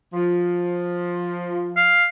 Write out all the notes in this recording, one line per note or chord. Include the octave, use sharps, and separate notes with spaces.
F3
F5